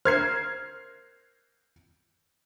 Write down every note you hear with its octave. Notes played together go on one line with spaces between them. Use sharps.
A#4 C5 F6 G#6 C7